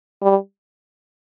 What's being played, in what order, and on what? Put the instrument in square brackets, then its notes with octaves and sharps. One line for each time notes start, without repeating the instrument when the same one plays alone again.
[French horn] G3